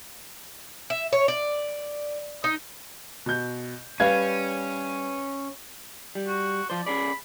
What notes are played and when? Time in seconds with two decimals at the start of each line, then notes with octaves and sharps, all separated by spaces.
0.90 E5
1.13 C#5
1.28 D5
2.44 D#4
3.26 B2 G6
4.00 G3 C#4 B4 F5 G#6
6.15 G3
6.27 F#4
6.70 F3 C5 D5
6.86 C#4 G#4 D5 B5